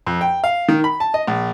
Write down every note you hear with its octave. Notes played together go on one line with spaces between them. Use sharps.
F2
G5
F5
D#3
B5
A5
D#5
A#1